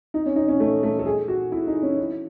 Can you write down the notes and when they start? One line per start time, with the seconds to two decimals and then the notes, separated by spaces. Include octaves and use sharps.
0.14 D#4
0.26 C#4
0.36 D#4
0.48 C#4
0.60 A3
0.83 A3
0.99 A4
1.06 G#4
1.28 F#4
1.52 E4
1.67 D#4
1.82 C#4
1.98 E4